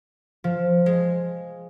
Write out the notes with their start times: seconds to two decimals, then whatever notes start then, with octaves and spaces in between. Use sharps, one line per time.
0.44 F3
0.86 G#3